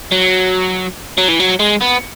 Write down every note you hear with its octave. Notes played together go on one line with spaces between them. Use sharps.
F#3
F#3
E3
F#3
G#3
B3